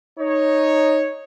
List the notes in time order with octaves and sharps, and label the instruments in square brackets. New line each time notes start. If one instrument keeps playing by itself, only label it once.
[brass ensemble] D#4 C#5